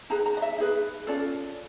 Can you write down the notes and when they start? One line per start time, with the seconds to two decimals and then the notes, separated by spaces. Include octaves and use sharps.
0.10 D#4 G#4 B4 A#5
0.26 A#5
0.37 D#5
0.42 E5
0.58 D#4 G#4 B4
1.07 C#4 F4 A4 D5